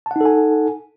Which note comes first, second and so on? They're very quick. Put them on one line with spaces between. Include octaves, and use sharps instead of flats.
A5 F#5 D#4 A4 G#5